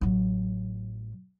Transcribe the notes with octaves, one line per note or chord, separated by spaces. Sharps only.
A1 F#3